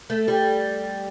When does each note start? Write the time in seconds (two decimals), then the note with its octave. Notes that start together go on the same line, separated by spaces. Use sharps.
0.10 A3
0.28 G3